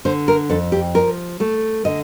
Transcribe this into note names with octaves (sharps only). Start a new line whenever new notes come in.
D3 C5
A#4
F2 A4
G4
F3 A#4
A3 A4
D3 D#5